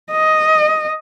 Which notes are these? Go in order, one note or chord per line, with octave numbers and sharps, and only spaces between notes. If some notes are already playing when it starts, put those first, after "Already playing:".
D#5